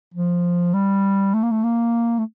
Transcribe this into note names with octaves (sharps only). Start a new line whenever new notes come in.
F3
G3
A3
A#3
A3
A#3
A3